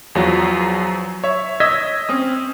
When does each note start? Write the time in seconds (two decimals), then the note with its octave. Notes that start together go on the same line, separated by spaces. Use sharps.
0.15 E2 F3 F#3
1.24 C#5 E5
1.60 D#5 E6 G#6 B6
2.09 C4 C#4 D#6